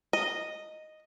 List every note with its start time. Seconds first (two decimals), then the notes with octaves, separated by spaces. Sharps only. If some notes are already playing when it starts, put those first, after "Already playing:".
0.13 D#5